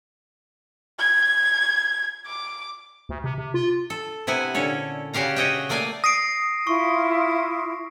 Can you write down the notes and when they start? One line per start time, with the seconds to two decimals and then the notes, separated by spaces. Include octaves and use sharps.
0.99 G#6
2.26 D6
3.09 D2
3.24 C3
3.38 C3
3.54 F4
3.90 A4
4.27 C3 B3 E4 F#5 G#5
4.54 A#2 D3 C#4 A4 C#5
5.13 C#3 C#4 F#4 G4 F5 A#5
5.36 F#4 G#4 C#5 D#5 E5 G5
5.69 A3 A#3 D5 F5 G#5
6.04 D#6 A#6 C7 D7
6.67 E4 F4 C6 C#6